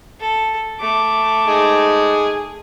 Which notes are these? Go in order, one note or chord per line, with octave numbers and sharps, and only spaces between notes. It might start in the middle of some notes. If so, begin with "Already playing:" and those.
A4
A3 D6
D#4 G#4